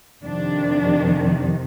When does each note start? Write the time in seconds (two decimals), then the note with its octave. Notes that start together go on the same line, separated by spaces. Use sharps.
0.24 F2 C3 D#3 D4